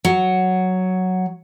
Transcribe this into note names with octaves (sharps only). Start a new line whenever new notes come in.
F#3